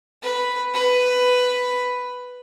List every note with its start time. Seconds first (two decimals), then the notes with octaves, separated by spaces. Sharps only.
0.22 B4
0.74 B4